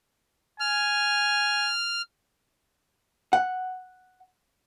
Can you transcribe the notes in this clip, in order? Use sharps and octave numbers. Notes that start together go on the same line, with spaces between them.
G#5 F6
F#5